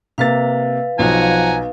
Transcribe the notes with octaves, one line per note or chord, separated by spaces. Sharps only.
C3 A#3 B4 F5 A6
B1 F3 F#5 G#5 A#5